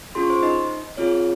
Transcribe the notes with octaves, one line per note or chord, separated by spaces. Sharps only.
C#4 F4 G#4 C6
C#6
C5 C6
D#4 D#5
C4 F4 G#4 C#5